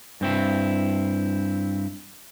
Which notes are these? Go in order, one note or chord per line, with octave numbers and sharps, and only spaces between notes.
G2 C4 E4